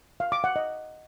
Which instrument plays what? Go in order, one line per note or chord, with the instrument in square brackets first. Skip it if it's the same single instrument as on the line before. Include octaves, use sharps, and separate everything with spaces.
[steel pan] F5
D6
F#5
D#5